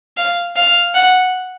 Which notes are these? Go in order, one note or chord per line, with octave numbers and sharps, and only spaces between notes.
F5
F5
F#5